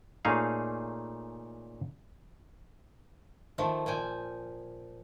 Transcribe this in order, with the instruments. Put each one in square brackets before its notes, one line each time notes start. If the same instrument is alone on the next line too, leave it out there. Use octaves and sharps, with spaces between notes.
[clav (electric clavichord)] A#2 A3 C#4 D#4 G#4 F5
[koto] D#3 F3 A3
A#2 F3 G5 G#5